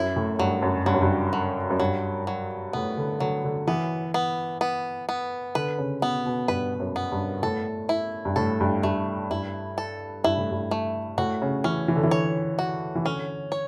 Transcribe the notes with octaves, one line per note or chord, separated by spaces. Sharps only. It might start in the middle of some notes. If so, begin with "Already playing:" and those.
Already playing: F#2 E4
A2
G2 F#3
F#2
G2 F#3
F#2
G2
F#3
F#2
G2 F#3
F#3
A2 B3
D3
D3 F#3
D3
E3 B3
B3
B3
B3
D3 B4
C#3
B2 B3
B2
G2 B4
F#2
B3
G2
A2 A4
E4
G2
A2 A4
G2
G2 A3
G2 E4
A4
G2 E4
A2
G2
A3
A2 F#4
C#3
E3 C#4
E3
D3
E3
C#5
F#4
E3
D3 C#4
C#5